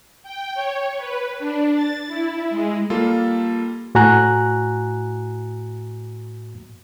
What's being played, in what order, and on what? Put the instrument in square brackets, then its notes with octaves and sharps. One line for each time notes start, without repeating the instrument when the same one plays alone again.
[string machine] G5
C#5
B4
D4
A6
E4
G#3
[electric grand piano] G3 A#3 F4 A4
[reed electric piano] A2 F#4 G#5 A#5 F#6